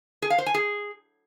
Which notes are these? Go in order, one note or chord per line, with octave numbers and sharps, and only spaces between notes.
G#4
F5
C5
G#5
G#4